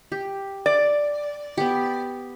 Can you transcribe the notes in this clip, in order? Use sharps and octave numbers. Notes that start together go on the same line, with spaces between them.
G4
D5
B3 G4